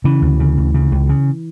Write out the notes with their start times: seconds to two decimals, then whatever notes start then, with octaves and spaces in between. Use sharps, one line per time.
0.04 C#3 E3
0.22 D2
0.40 C#3
0.57 D2
0.74 C#3
0.92 C#2
1.09 C#3